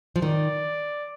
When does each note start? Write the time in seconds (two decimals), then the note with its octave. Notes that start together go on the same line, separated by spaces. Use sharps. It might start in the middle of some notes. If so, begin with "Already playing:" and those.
0.16 F3
0.22 D#3 D5